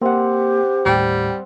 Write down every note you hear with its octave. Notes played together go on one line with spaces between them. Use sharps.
A#3 C4 G4 F#5
D#2 A2 G3 G5